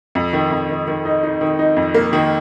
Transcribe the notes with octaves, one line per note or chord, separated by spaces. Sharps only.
F2
D#3
F2
D#3
D#3
D#4
D#4
D#3
D#4
F2
A#3
D#3